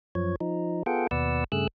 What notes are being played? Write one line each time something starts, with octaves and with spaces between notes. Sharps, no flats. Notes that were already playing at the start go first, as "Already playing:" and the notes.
F#2 F3 C#5
F3 D#4
B3 F4 G#4 A4 F#5 G5
D#2 B2 B4 D5 F#5 E6
G2 C#3 A3 G#4 E6 F#6